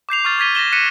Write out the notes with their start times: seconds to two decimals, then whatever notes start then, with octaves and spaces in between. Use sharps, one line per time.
0.09 D6 G6 C7 F7
0.25 C#6 F6 A6
0.38 D6 G#6 A6 B6 D#7 G7
0.55 A#6 B6 E7 G7
0.72 F#6 A#6 B6 C#7 D#7 E7